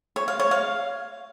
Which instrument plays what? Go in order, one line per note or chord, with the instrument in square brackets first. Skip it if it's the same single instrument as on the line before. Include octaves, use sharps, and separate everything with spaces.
[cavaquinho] C#5
F5
C#5
F5